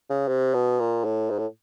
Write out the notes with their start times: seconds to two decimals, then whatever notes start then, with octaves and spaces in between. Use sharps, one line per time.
0.10 C#3
0.28 C3
0.54 B2
0.80 A#2
1.05 A2
1.30 G#2
1.39 A2